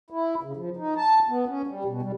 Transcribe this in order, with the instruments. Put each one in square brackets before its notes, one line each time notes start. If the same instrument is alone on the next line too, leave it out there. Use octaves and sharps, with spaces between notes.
[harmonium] E4
C#3
F3
D#4
A5
B3
C#4
G3
B2
G3